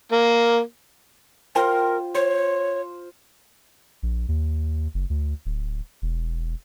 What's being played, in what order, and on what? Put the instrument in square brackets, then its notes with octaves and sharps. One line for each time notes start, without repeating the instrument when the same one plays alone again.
[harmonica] A#3
[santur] F4 C5 [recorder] A#4 [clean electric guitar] G5
[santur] C5 [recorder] C#5
[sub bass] A#1
D#2
F#1
D2
D1
E1